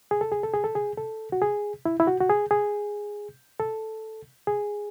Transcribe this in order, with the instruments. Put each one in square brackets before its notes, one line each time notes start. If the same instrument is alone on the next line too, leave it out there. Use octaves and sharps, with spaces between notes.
[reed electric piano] G#4
A4
G#4
A4
G#4
A4
G#4
A4
F#4
G#4
E4
E4
F#4
F#4
G#4
G#4
A4
G#4